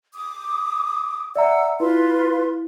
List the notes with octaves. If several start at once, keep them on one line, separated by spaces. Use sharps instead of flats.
D6 D#6
D5 E5 F#5 A#5 E6
E4 F4 B4 C6